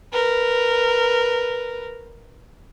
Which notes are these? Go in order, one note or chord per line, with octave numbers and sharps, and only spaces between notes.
A#4 B4